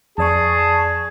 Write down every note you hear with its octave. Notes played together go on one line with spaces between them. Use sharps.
F2 G#4 D5 A5 C#6